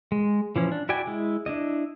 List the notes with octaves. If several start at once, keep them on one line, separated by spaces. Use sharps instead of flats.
G#3
E3 F3 C#4
D4
E4 F#4 D5 G5 G#5
G#3 E4
D4 E4 D#5